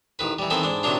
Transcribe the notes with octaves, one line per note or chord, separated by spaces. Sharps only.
A1 D#3 B4
E3 G3
D#3 E3 B3 C4 A4
G#2 D4
C3 D#3 F#3 D4 F4